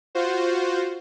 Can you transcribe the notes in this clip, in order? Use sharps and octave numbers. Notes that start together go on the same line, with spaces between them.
F4 F#4 C5